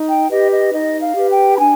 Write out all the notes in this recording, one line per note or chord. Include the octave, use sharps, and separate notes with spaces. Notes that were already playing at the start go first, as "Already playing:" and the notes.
Already playing: D#4
G5
G4 B4 D#5
D#5
D#4 D#5
F5
G4 B4
G5
B5
D4 G#5